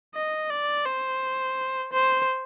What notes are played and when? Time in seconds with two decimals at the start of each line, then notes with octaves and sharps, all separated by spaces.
0.15 D#5
0.50 D5
0.86 C5
1.93 C5